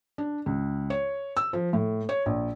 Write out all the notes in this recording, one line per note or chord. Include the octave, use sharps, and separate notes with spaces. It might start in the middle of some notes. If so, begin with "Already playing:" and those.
D4
C#2
C#5
E6
F3
A2
C#5
A#1